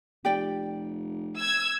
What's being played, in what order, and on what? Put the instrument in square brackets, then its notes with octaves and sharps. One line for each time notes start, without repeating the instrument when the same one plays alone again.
[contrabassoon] F1 [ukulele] G4 D5 G5
[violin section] E6 G#6